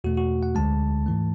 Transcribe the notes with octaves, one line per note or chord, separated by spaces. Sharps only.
E2 B2 A3 F#4
F#4
F#5
D2 D3 G#3 A5
G#2 E3 A3